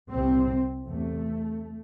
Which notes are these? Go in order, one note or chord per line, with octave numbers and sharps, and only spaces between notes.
C2 C3 C4
E2 C3 A3